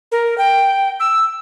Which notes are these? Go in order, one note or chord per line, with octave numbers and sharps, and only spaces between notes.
A#4
G5
E6